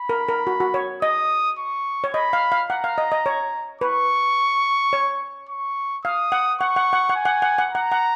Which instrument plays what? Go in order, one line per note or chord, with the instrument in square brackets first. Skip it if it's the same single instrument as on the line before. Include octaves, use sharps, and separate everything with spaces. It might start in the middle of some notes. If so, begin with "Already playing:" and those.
Already playing: [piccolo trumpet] B5
[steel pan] A#4
A#4
F#4
F#4
C#5
[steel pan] D#5 [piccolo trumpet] D#6
[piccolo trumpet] C#6
[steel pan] C#5
[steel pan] D#5 [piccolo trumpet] B5
[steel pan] F5
F5
[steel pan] F#5 [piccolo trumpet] A#5
[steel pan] F5
D#5
D#5
C#5
[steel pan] B4 [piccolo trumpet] C#6
[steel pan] C#5
[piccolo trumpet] C#6
[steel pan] F5 [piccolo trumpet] D#6
[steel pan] F#5
[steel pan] F#5 [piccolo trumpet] C#6
[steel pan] F#5
F#5
F#5
[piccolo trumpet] G#5
[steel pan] F#5
F#5
F#5
[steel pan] F#5 [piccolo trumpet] A#5
[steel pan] F#5